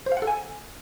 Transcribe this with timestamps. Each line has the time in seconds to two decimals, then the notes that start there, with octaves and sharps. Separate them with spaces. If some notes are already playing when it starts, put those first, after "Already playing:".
0.06 C5
0.12 F5
0.17 F#5
0.22 A4
0.27 G#5